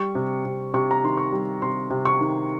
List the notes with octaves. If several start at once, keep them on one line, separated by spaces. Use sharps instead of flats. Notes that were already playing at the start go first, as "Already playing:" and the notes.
Already playing: G3 C#6
C3
C3
C3 C#6
A#5
D#3 C6
C#6
G3
C3 C6
C3
C#6
D#3